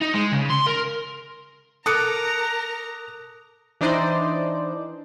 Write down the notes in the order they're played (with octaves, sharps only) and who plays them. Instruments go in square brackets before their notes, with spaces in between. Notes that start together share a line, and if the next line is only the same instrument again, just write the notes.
[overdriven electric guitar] D#4
G#3
C#3
C6
A#4
[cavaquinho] A4 D6 [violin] A#4 A#5 [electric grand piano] D#6 F#6 C#7
[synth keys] E3 D4 D#4 C5 D5 D#5